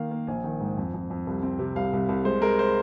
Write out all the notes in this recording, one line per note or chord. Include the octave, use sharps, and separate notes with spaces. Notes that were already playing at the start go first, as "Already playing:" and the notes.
Already playing: D#3 A#3 F5
A#3
A#1 G#5
D#3
G#2
F2
F2
F2
C2
C4
C3
C2 F5
C2
C2
G#3 C5
G#3 A#4
C5